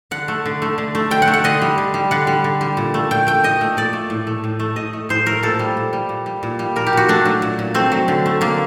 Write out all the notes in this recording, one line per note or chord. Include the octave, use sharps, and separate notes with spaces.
D3 F#5
A3
D3
A3
D3
A3
D3 G5
F#5
A3
F#5
D3 D#5
G3
D3
G3
D3 F#5
G3
D3
G3
A#2
A3
A#2 G5
A3 G5
A#2 D#5
A3
A#2 D5
A3
A2
A3
A2
A3
A2 D#5
A3
A2 C5
A3 A#4
A#2 A4
G3
A#2
G3
A#2
G3
A#2
G3
A#2 A#4
G4
A#2 F#4
A3 D4
F#3
A#2
A#2
A3 C4
F#3
D3
A3
D3 A#3